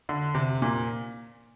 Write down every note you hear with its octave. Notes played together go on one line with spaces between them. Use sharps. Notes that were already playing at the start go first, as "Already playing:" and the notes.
D3
C3
A#2